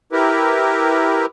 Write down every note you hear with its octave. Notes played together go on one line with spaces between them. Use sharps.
E4 G4 A#4 B4